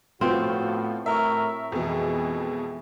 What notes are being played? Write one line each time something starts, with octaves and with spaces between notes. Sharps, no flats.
A2 F3 B3 C4 F4 F#4
A2 A#4 E5 C#6
F2 B2 E3 G#3 E4 G#4